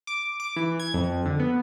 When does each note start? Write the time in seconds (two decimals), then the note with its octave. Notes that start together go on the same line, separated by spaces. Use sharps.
0.07 D6
0.40 D6
0.56 E3
0.80 G#6
0.94 F2
1.25 D3
1.39 B3